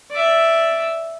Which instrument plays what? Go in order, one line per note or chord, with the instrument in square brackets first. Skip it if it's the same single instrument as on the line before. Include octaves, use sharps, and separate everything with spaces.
[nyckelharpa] D5 E5